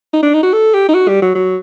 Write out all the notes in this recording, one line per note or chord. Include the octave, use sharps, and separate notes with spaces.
D#4
D4
D#4
F#4
A4
G4
D#4
F#4
G3
F#3
F#3